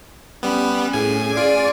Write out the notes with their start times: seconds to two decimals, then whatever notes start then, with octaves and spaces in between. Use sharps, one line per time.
0.43 G3 B3 C#4
0.93 A2 G#4 G#5
1.34 F4 D5 G#5